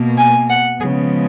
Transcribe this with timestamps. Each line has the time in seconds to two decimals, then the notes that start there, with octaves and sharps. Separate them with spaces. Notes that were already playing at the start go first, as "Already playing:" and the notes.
Already playing: B2 A#3
0.18 G#5
0.50 F#5
0.81 C#3 F3 G#3 B3 G#4